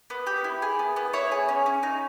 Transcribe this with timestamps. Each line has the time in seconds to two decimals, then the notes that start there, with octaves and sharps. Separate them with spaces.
0.10 B3
0.27 G4
0.44 E4
0.62 G#4
0.79 B3
0.96 B3
1.13 E4 C#5
1.32 G#4
1.49 C#4
1.66 C#4
1.83 D#4